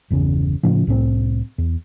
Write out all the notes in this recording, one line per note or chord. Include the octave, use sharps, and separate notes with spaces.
G1 E2 C#3
A2 C#3 F3
C2 A2 C4
E2